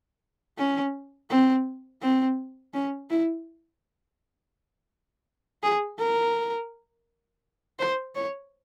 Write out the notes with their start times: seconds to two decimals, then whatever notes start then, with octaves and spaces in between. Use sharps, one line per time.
0.58 C#4
1.30 C4
2.02 C4
2.74 C#4
3.10 E4
5.63 G#4
5.99 A#4
7.79 C5
8.15 C#5